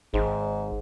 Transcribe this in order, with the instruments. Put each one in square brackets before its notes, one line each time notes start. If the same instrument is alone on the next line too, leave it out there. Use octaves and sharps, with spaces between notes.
[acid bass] G#1 [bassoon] G#2